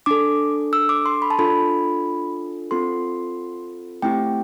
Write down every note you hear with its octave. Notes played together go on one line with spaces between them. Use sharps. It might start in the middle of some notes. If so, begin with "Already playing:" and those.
D4 A4 D6
E6
D6
C6
B5
A5
D4 F4 A4 B5
C4 F4 A4 C6
A3 C4 E4 G4 G5